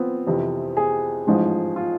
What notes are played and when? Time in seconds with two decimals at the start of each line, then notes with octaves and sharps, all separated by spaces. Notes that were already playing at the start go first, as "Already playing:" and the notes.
Already playing: F3 B3 C4 F4
0.27 F2 C3 E3
0.77 G#4
1.27 A1 G#2 F3 G#3
1.76 F4